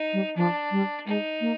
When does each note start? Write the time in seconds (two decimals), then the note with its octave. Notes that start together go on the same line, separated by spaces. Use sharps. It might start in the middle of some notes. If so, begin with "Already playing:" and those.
Already playing: D#4
0.13 G3
0.36 F3 D4
0.71 G3
1.06 G#3 D#4
1.41 A#3